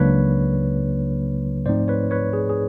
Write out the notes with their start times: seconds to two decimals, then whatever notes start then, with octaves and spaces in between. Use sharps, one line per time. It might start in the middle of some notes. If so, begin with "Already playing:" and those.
Already playing: C#2 C#3 F#3 A#3 D4 B4 C#5
1.66 G#2 F3 A3 C4 D#4 C5 D5
1.88 B4 C#5
2.11 B4 C#5
2.33 G#4
2.50 G#4